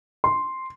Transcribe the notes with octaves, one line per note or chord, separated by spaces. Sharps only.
C6